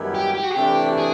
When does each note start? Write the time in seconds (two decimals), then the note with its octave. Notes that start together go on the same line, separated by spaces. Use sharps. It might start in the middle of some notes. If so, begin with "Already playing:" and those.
Already playing: F#2 D#3 G3 B3 E4
0.14 G4
0.34 G4
0.43 F#4
0.50 G4
0.56 C3 E3 A3 D4
0.98 G#4